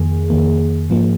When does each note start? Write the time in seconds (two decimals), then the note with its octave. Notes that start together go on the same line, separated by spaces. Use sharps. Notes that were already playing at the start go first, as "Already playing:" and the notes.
Already playing: F2 D#3 A#3 G#4
0.30 F2 D#3 A#3
0.90 G#2 F3 A#3